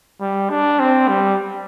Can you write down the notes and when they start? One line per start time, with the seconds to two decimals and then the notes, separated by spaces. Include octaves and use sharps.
0.21 G3
0.50 D4
0.80 C4
1.08 G3